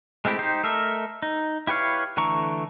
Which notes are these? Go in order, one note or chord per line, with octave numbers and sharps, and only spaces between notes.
G#3 A3 C4 E4 G4
D#4 G4 C5
A3 A4 A#4 D#5 E5
D#4
E4 G4 B4 C#5 F5
D3 E3 A3 A#5 C#6